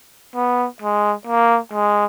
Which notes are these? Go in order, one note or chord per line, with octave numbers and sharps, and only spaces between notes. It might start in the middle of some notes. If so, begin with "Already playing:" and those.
B3
G#3
A#3
G#3